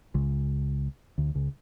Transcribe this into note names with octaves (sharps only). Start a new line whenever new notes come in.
C#2 C#3
D2 D3
C#2 C#3